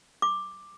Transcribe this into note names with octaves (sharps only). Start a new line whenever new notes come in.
D6